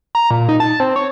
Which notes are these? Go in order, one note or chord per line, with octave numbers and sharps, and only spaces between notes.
A#5
A#2
D#4
A5
C4
C#5